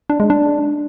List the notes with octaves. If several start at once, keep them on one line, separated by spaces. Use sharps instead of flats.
D4
G#3
D4